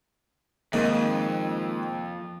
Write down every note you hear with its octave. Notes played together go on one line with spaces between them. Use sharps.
F2 G#2 D#3 A#3 D#7